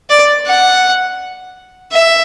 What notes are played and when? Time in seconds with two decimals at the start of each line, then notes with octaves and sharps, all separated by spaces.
0.10 D5
0.47 F#5
1.92 E5